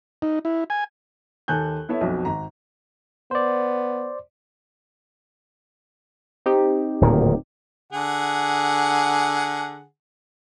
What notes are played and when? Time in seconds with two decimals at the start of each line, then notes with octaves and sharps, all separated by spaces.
0.22 D#4
0.45 E4
0.70 G#5
1.48 D#2 D#3 A4 G#5 F#6 G6
1.89 B3 E4 A4 C#5 E5
2.01 B1 F2 B2
2.25 G#1 A#5
3.31 B3 C5 D5
6.46 C4 D#4 G4
7.01 D1 A#2 D#3
7.93 D3 G#4 F#5